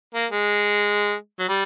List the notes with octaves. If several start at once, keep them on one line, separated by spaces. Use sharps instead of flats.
A#3
G#3
F#3
G3